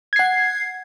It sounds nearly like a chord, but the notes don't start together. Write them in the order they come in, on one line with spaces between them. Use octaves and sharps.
G#6 C7 F#5